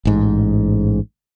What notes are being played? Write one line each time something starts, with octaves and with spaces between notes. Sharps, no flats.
A1 G#2